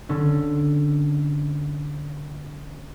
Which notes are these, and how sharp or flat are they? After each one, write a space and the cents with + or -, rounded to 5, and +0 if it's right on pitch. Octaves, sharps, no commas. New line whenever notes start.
D3 +0 C#4 +0